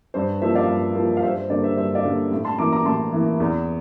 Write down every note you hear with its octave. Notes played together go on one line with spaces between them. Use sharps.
G2 C5
F3 A#3 C5 E5
D5 F5
G2
F3 A#3
F5
G2 C5 E5
C5
D3 G3 A#3 D5
C5 E5
G2 C5 E5
D5 F5
D3 G3 A#3
A2
A5 C6
E3 A#3 A#5 D6
A#5 D6
A2 A5 C6
E3 A#3
E2